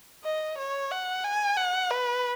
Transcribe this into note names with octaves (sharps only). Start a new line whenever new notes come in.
D#5
C#5
F#5
G#5
F#5
B4